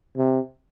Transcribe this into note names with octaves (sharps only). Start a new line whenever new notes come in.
C3